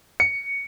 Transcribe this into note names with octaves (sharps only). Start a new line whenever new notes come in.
C#7